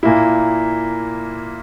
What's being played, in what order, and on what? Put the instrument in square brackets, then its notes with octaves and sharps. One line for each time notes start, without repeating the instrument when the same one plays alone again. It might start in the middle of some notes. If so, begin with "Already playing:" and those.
[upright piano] A#2 A#3 E4